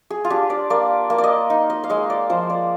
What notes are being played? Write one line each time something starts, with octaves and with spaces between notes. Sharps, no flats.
G#4
F4
D4 G4
D5
A#3 D5
A#3
D5
D#5
D#4
D#5
F5
G#3 D#5
D5
F3 C5
D5